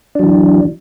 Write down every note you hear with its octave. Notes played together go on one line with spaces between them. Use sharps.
E3 F#3 D4